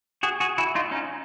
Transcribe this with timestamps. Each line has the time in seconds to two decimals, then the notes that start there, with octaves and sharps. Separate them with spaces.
0.23 F#4 G#4
0.40 F#4 G#4
0.58 E4 F#4
0.75 D#4 F4
0.91 C#4 D#4